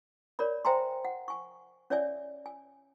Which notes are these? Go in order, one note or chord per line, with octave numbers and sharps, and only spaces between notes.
A#4 C#5 D5 B5
C5 E5 G5 G#5 A#5 C6
F#5
G#5 C#6
C#4 C#5 D5 E5 G#5
G#5